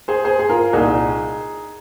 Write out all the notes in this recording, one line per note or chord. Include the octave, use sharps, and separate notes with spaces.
G#4 C5
G#4 C5
G#4
F4 A#4
C2 A#2 D#4 G#4